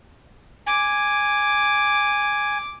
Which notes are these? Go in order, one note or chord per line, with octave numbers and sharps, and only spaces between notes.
G#5 D6